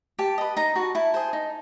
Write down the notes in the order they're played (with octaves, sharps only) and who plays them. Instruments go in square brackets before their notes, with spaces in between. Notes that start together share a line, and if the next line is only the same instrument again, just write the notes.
[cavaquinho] G4 A5
B4 D#5
D#4 A#5
F#4 B4 A5
E4 A5
G#4 C5
D#4